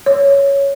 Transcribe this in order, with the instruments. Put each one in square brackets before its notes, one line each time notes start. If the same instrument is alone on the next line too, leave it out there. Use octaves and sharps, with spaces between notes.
[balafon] C#5